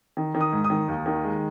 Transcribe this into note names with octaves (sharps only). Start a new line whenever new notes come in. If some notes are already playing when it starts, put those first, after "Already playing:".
D#3
D#3
D#6
G#2
D#6
D#3
D#2
D#3
G#3